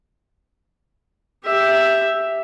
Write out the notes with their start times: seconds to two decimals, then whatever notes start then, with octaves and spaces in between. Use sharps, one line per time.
1.44 G4 E5